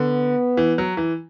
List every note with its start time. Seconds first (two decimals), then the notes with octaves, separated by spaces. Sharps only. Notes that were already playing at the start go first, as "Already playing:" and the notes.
Already playing: D3 B3
0.57 E3
0.78 F#3
0.97 E3